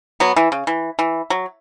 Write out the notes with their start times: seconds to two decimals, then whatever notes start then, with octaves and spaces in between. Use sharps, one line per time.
0.20 F#3 B3
0.36 E3
0.52 C#3
0.67 E3
0.99 E3
1.30 F#3